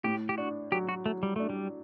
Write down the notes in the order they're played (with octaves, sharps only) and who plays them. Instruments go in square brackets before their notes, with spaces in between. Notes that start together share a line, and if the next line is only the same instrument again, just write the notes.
[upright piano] A2 [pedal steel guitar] G4
[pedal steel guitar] G4
[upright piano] D4 [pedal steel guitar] F#4
[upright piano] F#3 [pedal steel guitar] G4
[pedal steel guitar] F#4
[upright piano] F#3 [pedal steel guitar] A3
[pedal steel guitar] G3
[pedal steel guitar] A3 [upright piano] D4
[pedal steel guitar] G3